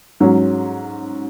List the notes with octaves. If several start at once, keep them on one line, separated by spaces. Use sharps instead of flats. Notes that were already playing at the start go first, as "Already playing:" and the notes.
G#2 F#3 C#4